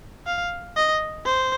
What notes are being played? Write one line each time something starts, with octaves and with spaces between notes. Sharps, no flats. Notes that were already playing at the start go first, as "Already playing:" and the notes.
F5
D#5
C5